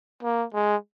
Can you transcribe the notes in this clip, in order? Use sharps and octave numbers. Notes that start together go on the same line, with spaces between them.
A#3
G#3